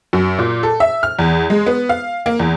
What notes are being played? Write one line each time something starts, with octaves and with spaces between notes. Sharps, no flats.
F#2
A#2
A4
E5
F6
E2
G#3
B3
F5
A#3
E2